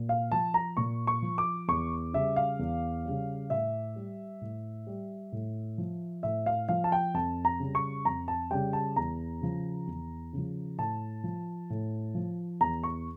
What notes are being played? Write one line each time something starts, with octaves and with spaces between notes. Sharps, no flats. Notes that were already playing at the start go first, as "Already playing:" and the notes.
Already playing: A#2
F5
F3 A5
A#5
A#2 C#6
C#6
F3
D6
E2 C#6
C#3 G3 E5
F5
E2
C#3 G3
A2 E5
G3
A2
G3
A2
F3
A2 E5
F5
F3 F5
A5
G5
F2 A5
A#5
C#3 G3
C#6
F2 A#5
A5
C#3 G3 G5
A5
E2 A#5
C#3 F3
E2
C#3 F3
A2 A5
F3
A2
F3
E2 A#5
C#6